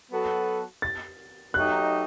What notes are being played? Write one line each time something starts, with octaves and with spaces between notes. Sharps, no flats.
F#3 B3 F#4 A4
A6
F#3 A3 D#4 G4 F#6